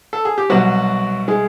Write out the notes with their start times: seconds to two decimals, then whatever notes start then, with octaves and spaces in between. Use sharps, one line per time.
0.13 A4
0.25 G#4
0.38 G4
0.50 C2 B2 F#3 F#4
1.28 G#3 G#4